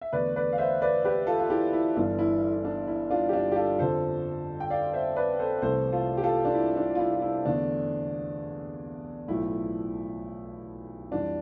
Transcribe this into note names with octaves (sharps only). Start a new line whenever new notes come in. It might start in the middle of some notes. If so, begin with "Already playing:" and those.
E5
E2 D3 A3 B4 D5
B4 D5
F5
C5 E5
B4 D5
G4 B4
F4 A4
F4
E4 G4
E4
G1 G2 E3 D4
E4
E4
D4
E4
D4 F4
G4
D4 F4
G4
F4 A4
F2 D3 F3 A4 C5
G5
D5 F5
C5 E5
B4 D5
A4 C5
C2 C3 E3 A3 A4 C5
F4 A4
G4
F4 A4
D4
E4
D4
F4
E4
F4
E4
E2 D3 A3 D4
B1 A2 F3 A3 E4
F2 E3 G3 D4